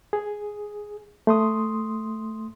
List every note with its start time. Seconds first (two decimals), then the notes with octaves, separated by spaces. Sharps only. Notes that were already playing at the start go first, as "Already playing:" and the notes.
0.13 G#4
1.27 A3 C6 D#6